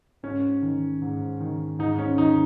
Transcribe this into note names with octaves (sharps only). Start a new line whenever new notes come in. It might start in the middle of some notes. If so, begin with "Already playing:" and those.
G#2 C#4
D#3
G#2
D#3
G#2 D#4
C#4
D#3 D#4